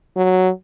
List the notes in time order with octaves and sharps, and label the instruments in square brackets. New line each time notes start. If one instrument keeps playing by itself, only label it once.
[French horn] F#3